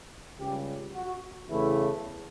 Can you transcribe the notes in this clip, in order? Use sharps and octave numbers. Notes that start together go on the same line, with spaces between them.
C#2 C#3 G3 G4
F#4
E2 C#3 E3 A3 E4